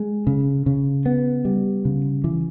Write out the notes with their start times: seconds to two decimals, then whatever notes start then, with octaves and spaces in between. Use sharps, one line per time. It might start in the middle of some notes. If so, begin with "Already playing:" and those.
Already playing: G#3
0.27 C#3
0.66 C#3
1.06 B3
1.45 G3
1.85 C#3
2.24 E3